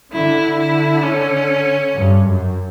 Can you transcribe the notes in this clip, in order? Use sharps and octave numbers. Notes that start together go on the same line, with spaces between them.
D3 E4
E4
C#4
G2
F#2